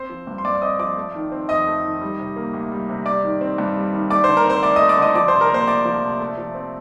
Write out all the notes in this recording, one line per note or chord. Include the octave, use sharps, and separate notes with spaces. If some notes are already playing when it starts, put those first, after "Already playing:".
Already playing: C4 C5 C6
F3
G2
C6
G2 D5 D6
D6
C4 D#5 D#6
F3 D5 D6
A3
D#3
C4
F2 D#5 D#6
A3
D#3
G3
C3
A#3
D2
G3
C3
G3 D5 D6
D#3
C4
G2
G3
D#3
A3 D5 D6
C5 C6
D3
A#4 A#5
C4 C5 C6
D2 D5 D6
D#5 D#6
A3
D5 D6
D3 D#5 D#6
F3 D5 D6
C5 C6
C3
A#4 A#5
A#3 C5 C6
D2 D5 D6
F3
C3
A3
F3
C4